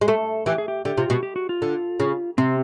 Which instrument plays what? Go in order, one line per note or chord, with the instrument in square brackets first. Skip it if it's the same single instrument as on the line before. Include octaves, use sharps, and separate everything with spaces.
[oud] G#3
[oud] A3 [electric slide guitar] A4
[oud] E3 [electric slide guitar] G4
[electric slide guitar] G#4
G4
[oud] D3 [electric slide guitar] G4
[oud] C3 [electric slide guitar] F4
[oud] B2 [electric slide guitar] F#4
[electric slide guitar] G4
F#4
F4
[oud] D3
C#3
[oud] C3 [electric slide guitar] C4